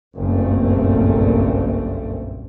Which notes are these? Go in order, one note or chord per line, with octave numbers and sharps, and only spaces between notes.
F#1 B1 G2 A#2 A3 C4